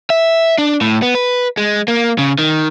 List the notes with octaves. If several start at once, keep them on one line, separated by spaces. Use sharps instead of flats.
E5
D4
A2
B3
B4
G#3
A#3
C#3
D#3